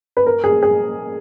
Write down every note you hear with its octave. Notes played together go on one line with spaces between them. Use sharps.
B4
A#4
G#4
G#4